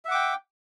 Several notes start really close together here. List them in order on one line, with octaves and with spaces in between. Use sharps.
E5 F#5 D6 G5